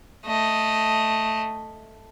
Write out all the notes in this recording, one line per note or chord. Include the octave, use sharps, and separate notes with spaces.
A3 D#5